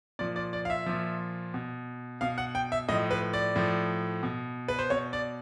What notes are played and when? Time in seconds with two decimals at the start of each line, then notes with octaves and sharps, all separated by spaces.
0.19 A#2 F3 D5
0.36 D5
0.53 D5
0.65 F5
0.70 E5
0.86 A#2 F3
1.54 B2
2.21 B2 F5
2.38 F#5
2.55 G5
2.72 E5
2.88 A2 D#5
2.92 F3
3.11 B4
3.33 D5
3.56 A2 F3
4.23 B2
4.68 B4
4.79 C5
4.90 B2 C#5
5.13 D5